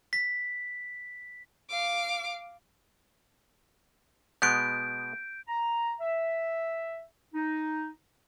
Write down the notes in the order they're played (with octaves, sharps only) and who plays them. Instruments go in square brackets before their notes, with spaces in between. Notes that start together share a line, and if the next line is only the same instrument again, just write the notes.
[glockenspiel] B6
[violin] F5 D6
[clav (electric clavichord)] B2 G#3 B3 [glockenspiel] G6 D7
[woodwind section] A#5
E5
D#4